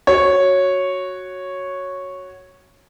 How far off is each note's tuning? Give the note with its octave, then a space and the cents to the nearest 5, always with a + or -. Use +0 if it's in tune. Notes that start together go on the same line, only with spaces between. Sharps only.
F#4 +0 C#5 -5